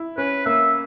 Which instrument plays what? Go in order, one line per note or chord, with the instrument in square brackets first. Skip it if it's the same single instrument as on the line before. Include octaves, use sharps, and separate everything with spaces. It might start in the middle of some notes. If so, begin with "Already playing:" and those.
Already playing: [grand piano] E4
[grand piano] C#4 [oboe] B4
[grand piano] A#3 [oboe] E5